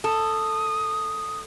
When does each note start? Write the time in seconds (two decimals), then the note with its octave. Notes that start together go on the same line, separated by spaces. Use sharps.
0.04 A4 D#6